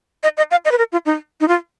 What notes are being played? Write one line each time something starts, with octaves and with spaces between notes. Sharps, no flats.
D#5
D#5
F5
D#5
B4
A#4
F4
D#4
D#4
F4